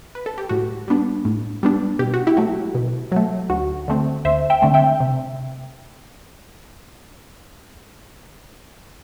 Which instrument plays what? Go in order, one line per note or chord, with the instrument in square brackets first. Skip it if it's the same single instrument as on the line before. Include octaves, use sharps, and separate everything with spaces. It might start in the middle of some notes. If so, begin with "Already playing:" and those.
[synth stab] B4
A4
G4
A2 F#4
G3 B3 D4
A2
G3 B3 D4
B2 G4
F#4
E4 G4
F#3 A3
B2
F#3 A3
D2 F#4
D3 A3 C4
D2 C5 E5
E5 G5
D3 A3 C4
E5 G5
C3